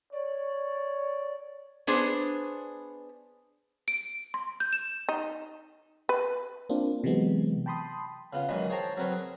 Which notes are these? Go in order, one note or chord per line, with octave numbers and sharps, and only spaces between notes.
C#5 D5
B3 D4 G#4 C5
D7
C6
G6
E7
D#4
B4
A#3 C4 D4 F4
C3 E3 F#3 G#3 B3 C4
G5 A5 B5 C6 D#6
C#3 B3 F4
A#2 D#3 E3 F#3 G#3 B3
G#4 C5 C#5 G5 A5 A#5
F#3 C4 A#4 B4 C#5
G#4